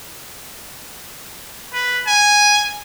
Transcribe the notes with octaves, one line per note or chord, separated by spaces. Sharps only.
B4
G#5